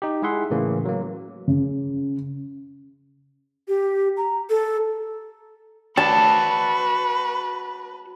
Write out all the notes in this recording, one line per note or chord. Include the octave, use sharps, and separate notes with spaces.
D#4 G4
G#3 E4 G#4 E5 F#5 C6
A2 C#3 E3 A#3
F#3 A#3
C#3
G4
A#5
A4
F#4 B4 D5 A5